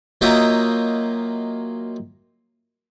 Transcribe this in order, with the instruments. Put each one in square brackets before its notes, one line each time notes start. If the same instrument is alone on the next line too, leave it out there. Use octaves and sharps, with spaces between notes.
[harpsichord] F#3 A#3 F4 D#5 E5 G5